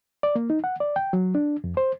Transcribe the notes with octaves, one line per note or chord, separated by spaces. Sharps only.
D5
A#3
D#4
F#5
D5
G5
F#3
D4
F2
C5